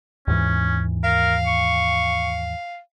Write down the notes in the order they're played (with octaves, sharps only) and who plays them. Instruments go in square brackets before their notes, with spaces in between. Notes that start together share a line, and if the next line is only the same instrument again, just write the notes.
[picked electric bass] D#2 G#2 E3 [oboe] C#4
[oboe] A#4 [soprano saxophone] F5
[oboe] C#6